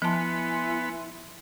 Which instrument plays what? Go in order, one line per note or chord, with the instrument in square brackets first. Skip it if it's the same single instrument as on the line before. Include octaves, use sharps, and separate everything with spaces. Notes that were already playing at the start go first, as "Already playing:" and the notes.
[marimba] F3 A5 [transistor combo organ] B3 [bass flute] E4 [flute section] E5 G#5 C6